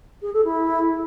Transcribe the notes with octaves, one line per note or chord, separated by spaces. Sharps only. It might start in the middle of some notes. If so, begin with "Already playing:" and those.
G#4
A4
E4